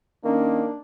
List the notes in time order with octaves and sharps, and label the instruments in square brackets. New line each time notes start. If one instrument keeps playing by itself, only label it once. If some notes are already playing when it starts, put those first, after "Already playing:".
[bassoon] D#3 [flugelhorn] A#3 [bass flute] C#4 [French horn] D4